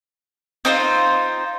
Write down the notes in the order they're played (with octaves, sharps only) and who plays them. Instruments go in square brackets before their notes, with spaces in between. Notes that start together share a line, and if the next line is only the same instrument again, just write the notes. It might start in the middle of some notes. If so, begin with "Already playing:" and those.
[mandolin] C4 D#4 F4 C5